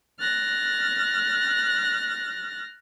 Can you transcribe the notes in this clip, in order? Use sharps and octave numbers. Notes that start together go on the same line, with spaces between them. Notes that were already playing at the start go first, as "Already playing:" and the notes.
F6 F#6 A6 A#6